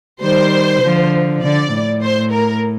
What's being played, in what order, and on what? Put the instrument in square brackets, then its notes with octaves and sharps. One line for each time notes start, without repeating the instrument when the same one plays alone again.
[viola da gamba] D#3 G3 [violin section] C5
[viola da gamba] D3 F3
[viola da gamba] D3 [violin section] D5
[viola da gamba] A2
[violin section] C5
A#4